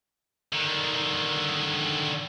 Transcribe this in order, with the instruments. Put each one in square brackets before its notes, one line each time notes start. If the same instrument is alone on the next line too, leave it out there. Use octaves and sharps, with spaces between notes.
[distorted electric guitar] D3 D#3